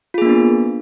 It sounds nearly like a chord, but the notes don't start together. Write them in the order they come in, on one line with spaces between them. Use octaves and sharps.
F4 G#4 A#3 D4 B3